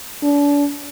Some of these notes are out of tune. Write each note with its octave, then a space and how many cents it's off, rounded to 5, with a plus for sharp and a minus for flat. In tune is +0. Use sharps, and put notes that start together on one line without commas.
D4 -35